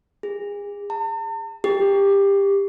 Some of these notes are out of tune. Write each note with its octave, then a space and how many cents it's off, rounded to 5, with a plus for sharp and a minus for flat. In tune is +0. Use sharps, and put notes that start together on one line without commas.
G#4 -35
A5 +45
G4 +20